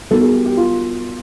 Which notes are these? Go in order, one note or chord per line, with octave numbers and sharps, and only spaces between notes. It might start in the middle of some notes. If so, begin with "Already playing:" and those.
G3 B3 D#4 F#4 A4 A#4
G#4
G4
G4
F4